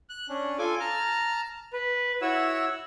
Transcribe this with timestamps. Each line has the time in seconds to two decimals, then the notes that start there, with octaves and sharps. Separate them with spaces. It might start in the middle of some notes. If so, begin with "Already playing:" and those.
0.10 F#6
0.29 C#4 D4
0.59 F4 A4 G#5 D6
0.80 A5 A#5 F6
1.73 B4
2.22 E4 F#4 C#5 F#5 E6